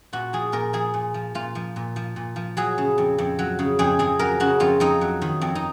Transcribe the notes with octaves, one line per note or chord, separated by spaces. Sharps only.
A#2 F#4
F3 G#4
A#2 A#4
F3 G#4
A#2
F3
A#2 F4
F3
A#2
F3
A#2
F3
F#3 G#4
C#3
F2
F2
F#3
C#3
F2 G#4
F2 G#4
F#3 A#4
C#3 F#4
F2 F4
F2 D#4
F#3
D#3
F2
D#4